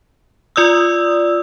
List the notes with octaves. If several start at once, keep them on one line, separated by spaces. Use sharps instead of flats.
F4 D5 D#6 E6